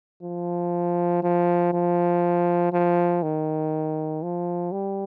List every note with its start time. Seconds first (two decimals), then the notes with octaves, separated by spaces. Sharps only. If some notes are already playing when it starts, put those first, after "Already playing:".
0.23 F3
1.23 F3
1.73 F3
2.73 F3
3.23 D#3
4.23 F3
4.72 G3